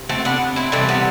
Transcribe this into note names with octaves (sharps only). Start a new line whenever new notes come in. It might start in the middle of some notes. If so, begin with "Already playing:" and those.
Already playing: C3
A3 C4
B3 D4
C4 E4
C3 E3 G3 A3 C4
B3